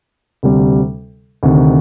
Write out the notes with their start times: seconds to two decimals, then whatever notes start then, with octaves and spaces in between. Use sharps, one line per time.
0.43 D2 C3 G3
1.43 D2 C3 D#3